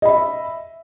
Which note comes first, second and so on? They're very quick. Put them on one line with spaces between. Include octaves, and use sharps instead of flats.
D#5 B5 E5